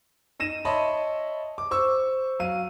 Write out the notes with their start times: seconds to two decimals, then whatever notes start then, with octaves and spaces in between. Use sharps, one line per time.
0.39 D#4 A#6 D#7 E7
0.65 C#5 D#5 E5 A5 B5 C6
1.58 D6
1.71 C5 C#6 E6
2.39 F#3 F5 D#7